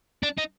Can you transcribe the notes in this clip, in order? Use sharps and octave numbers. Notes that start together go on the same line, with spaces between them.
D4
D#4